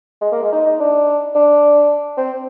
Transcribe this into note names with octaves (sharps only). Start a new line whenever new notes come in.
G#3
A#3
G#3
D#4
D#4
D4
D4
C4